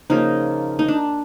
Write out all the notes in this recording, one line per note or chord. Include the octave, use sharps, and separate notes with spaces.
C#3 F3 A#3 D#4
D#4
D4